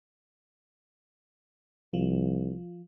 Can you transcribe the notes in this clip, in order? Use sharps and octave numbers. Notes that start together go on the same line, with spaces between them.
C2 F3